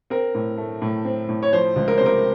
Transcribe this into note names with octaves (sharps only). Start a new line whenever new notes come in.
C4 A#4
A2
A3
A2
C4
A2
C#5
F3 C5
C#2
A#4
C3 C5
A#4